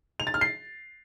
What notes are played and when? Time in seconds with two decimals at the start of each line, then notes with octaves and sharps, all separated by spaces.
0.20 F7
0.27 A6
0.34 F6
0.41 C7